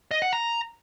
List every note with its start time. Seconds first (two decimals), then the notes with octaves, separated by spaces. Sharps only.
0.11 D#5
0.22 F#5
0.33 A#5